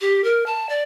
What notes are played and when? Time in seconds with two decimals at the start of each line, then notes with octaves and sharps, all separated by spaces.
0.01 G4
0.24 A#4
0.46 A5
0.69 D5